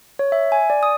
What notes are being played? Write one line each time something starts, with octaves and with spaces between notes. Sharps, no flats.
C#5
E5
G#5
D5
D#6